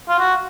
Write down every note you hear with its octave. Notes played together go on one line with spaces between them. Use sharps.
F4
F#4